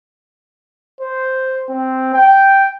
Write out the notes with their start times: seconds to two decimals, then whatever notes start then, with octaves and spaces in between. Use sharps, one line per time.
1.01 C5
1.69 C4
2.14 G5